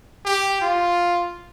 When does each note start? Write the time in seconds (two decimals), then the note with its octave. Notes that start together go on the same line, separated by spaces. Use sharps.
0.25 G4
0.62 F4